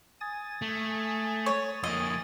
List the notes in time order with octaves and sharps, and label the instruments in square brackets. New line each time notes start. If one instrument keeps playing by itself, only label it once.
[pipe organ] G#5 D#6 A6
[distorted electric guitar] A3
[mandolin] C#5
[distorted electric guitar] F2 A#3 [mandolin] D#5